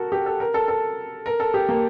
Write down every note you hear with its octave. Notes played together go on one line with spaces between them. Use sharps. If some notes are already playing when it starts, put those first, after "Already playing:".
Already playing: F#4 A4 A#4
G4
A4
A#4
A4
A4
A#4
A4
G4
A#3